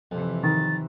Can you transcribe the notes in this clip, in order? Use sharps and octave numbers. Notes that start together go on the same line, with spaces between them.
F2 C3 E3
D#3 A6